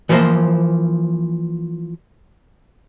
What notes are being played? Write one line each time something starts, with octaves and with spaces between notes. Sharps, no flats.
E3 F3 A#3 A#4 C5 D#5